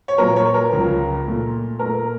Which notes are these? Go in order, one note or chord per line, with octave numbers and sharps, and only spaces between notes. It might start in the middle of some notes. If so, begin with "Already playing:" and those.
C#5
A#2 F3 A#3 A#4
C#5
A#4
C#2 C#3 F3
A#2 A3
A#2 A3 A#4